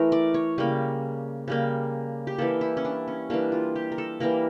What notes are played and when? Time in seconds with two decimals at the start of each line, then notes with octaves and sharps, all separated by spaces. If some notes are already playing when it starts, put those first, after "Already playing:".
Already playing: E3 A3 A#4
0.12 D5
0.34 C#5
0.58 C#3 G3 A#3
1.48 C#3 G3 A#3
2.27 G4
2.38 E3 G3 A#3 A4
2.61 E4
2.77 C#4
2.85 D4
3.07 C#4
3.30 E3 G3 A#3 D4
3.52 F4
3.75 G4
3.92 A#4
3.98 A4
4.20 E3 G3 A#3 A#4